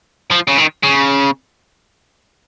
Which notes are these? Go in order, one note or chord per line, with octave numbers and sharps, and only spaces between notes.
F3
C#3
D#3
C#3